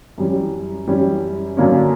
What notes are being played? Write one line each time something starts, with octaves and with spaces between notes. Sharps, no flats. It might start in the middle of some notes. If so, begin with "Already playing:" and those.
F#2 E3 G3 C#4
F#2 E3 G3 C#4
F#2 D3 F#3 A#3 C#4